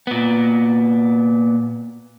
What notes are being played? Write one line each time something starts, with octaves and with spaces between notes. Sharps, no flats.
A#2 B3